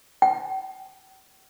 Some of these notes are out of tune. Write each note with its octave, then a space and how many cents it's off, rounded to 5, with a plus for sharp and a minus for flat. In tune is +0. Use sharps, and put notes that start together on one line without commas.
G5 -45